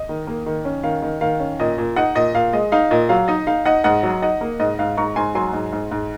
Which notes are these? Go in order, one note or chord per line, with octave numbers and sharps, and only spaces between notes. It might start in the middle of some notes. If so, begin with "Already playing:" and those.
Already playing: D#5
D#3
A#3
D#3
C#4
D#3 F5
D#3
D#3 F5
C#4
A#2 D#5
A#2
D#4 D#5 F#5
A#2 D#5
A#2 F5
G#3 D#5
D#4 F5
A#2 D#5
F#3 F5
D#4 D#5
D#4 F5
D#4 D#5 F#5
G#2 D#5 F#5
F#3
D#4 D#5 F#5
A#3
G#2 D#5
G#2 F5
G#2 A#5 C#6
G#2 G#5 C6
F#3 G#5 C6
G#2
G#2
G#2